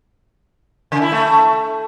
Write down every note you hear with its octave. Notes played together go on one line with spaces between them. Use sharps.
C#3
E4
A3